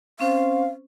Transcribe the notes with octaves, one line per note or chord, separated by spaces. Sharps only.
C4 C#4 C5 F5